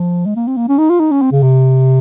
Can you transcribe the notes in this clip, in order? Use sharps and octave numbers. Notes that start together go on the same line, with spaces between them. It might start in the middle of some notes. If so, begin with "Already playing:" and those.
Already playing: F3
G#3
A#3
C4
A#3
C#4
D#4
F4
D#4
C#4
C4
C#3
C3